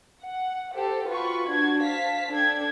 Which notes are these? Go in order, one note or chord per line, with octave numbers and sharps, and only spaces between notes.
F#5
G4 A4 C5
F4 F#4 B4 B5 C#6
D4 F#4 G#6
C5 F5 A5 B6
D4 A4 G5 G#6